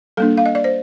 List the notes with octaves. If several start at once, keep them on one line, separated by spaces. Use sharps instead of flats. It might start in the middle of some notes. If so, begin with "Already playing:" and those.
G3 A#3 D4 A4
F5
D#5
D5
C5